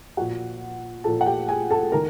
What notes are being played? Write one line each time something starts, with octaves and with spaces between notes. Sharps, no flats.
A#2 F3 F#4 F#5
A#2 F3 A4 A5
F#5
G4 G5
G#4 G#5
A4 A5
D#3 A#4 A#5